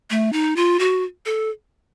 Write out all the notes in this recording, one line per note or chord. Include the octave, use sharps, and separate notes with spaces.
A3
D#4
F4
F#4
A4